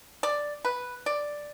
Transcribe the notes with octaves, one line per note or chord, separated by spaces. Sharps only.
D5
B4
D5